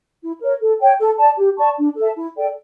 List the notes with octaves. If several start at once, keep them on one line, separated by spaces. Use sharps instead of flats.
E4
A#4 C#5
A4
C#5 G5
A4
D5 A5
G4
D5 A5 C#6
D4
A4 E5 A5
E4
A4 D5 G5